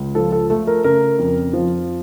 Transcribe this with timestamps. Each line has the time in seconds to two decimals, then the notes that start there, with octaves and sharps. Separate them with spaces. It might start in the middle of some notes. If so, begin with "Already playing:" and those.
Already playing: C#2
0.15 F3 A4
0.32 A4
0.50 A3 A4
0.67 A#4
0.84 C#3 A#4
1.19 F2
1.53 F3